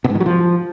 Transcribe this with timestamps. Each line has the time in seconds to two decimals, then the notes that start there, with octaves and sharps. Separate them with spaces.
0.04 B2
0.10 G#2
0.15 D#3
0.20 F#3
0.26 F3